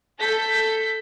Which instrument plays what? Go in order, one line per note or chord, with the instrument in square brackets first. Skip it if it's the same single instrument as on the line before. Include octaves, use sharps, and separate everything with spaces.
[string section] A4 G6 B6